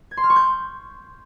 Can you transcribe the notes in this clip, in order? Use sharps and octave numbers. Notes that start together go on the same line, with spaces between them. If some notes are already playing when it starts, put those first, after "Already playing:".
G#6
C6
F6
C#6
G6